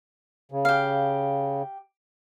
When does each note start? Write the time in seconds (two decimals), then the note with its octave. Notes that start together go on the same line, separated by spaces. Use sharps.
0.52 C#3
0.65 G4 F5